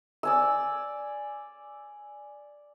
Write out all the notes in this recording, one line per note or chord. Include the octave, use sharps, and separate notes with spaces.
D5 G#5 E6